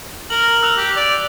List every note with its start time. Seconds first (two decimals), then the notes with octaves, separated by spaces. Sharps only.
0.30 A#4 F#7
0.63 E6 F#6 F7
0.77 G4
0.96 D5